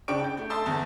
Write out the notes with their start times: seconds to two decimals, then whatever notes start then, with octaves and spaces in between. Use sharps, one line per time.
0.08 C#3 D4 G5 C#6 D7
0.20 G5 G6
0.37 A3
0.50 E5 A5 C6 D#6 E6
0.65 G1 E2 A5